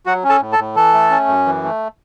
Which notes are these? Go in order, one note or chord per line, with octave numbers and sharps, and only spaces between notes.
F#3 F#4 F#5
C#4
A4 A5
A2
A4 A5
A2
E3 A4 A5
A3
C#4
F#2
E3
A3